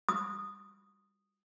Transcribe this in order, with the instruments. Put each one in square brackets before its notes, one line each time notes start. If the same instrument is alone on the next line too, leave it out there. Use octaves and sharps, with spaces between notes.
[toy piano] D#6